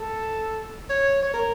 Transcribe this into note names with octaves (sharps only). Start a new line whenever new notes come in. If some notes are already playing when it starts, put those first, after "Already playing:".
Already playing: A4
C#5
C#5
A#4